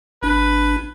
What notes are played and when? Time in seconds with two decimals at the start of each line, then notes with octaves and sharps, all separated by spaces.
0.23 G#1 D4 B4